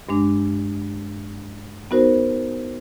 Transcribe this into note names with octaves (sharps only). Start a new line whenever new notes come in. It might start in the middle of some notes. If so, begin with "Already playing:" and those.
G2 G#3 D4
B3 D#4 F#4 A#4 C5